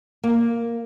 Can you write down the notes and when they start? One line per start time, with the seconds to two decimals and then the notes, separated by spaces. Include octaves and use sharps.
0.24 A#3